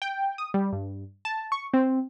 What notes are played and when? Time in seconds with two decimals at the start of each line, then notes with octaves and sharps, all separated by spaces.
0.02 G5
0.38 D#6
0.54 G3
0.73 G2
1.25 A5
1.52 C#6
1.74 C4